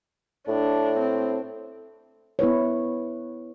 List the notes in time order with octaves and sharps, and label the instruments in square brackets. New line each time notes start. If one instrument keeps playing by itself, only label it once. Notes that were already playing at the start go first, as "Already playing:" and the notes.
[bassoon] A2 [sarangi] D4
[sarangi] C4
[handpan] B3 E4 B4 C#5